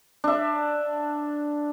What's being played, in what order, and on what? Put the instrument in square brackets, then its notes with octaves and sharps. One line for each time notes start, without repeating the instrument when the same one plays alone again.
[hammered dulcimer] D4 E5